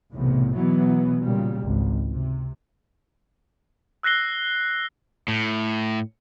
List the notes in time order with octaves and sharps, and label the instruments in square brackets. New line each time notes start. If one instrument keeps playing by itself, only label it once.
[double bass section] B1 E2 A2 C3
B2 E3 F#3 B3
A#2 C#3 G3
G#1 C#2
C3
[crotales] E6 F#6 A#6 C7 G7
[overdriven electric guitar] A2